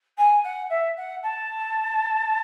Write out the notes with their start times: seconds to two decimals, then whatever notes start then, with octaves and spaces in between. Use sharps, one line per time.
0.17 G#5
0.44 F#5
0.70 E5
0.97 F#5
1.23 A5